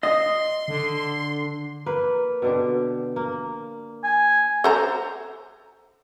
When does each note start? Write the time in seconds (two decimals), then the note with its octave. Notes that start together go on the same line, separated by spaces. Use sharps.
0.03 D#5 C6
0.68 D3
1.86 A#3 B4
2.42 B2 D3 G4
3.16 A#3
4.04 G#5
4.64 A4 C5 A#5